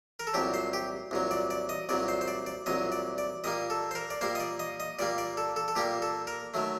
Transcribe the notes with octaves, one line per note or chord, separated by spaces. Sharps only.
A#4
A4
C2 A#2 F#3 G4
C5
G4
C2 A#2 F#3
D5
D5
D#5
C2 A#2 F#3 D5
C5
C5
D5
D5
C2 A#2 F#3 D#5
D5
D5
A#2 G3 A#3 D#5
A4
C5
A#4
D5
A#2 G3 A#3 C5
D#5
D5
D#5
D#5
A#2 G3 A#3 D5
D5
A4
A4
A4
A#2 G3 A#3 G4
A4
A#4
D#3 F#3 A3